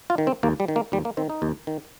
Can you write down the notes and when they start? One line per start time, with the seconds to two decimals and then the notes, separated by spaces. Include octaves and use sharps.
0.10 F4
0.18 D#3
0.27 C4
0.43 D#2 A#3
0.60 G3
0.68 D#3
0.76 A#3
0.92 D#2 G3
1.05 A#3
1.17 D#3 C4
1.30 D#4
1.42 D#2
1.67 D#3